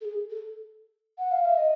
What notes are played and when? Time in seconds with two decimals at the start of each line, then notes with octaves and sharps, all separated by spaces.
0.01 A4
0.05 G#4
0.30 A4
1.18 F#5
1.31 F5
1.45 E5
1.57 D#5